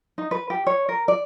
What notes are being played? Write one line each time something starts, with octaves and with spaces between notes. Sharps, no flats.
D#4
B4
G4
C#5
A#4
D5